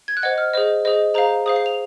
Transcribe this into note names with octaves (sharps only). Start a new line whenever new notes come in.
G#6
F#6
C5 D#5 F#5 G#6
F6
G#4 C5 D#5
G#4 C5 D#5
G#4 C5 F5 A#5
G#4 C5 F5 D#6
C7
F7